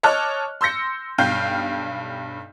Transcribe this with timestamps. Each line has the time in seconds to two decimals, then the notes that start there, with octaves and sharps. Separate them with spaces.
0.03 C#5 D#5 A5 D6 F6 F#6
0.61 C6 E6 G6 A#6 C#7
1.18 B1 G2 F5 G5 F6 G6